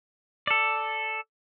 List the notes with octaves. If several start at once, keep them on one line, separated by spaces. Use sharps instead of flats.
A4 D5